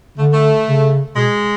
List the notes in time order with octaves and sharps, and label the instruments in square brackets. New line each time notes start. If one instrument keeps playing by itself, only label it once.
[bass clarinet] D3 [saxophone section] A3
[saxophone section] A3
[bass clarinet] C#3
[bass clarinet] B2 [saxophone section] G#3